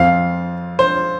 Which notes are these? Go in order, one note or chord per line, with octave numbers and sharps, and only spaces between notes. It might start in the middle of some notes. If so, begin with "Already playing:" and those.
Already playing: F2 F3 F5
C5